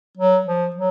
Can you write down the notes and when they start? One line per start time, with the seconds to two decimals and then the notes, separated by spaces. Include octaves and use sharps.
0.17 F#3
0.46 F3
0.75 F#3